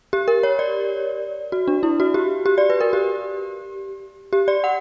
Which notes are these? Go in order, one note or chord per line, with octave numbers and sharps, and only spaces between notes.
G4
A#4
C#5
D5
F#4
D4
E4
F#4
G4
G4
D5
B4
A#4
G4
G4
D5
F#5